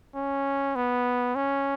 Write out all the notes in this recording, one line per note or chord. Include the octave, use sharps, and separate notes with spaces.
C#4
B3
C#4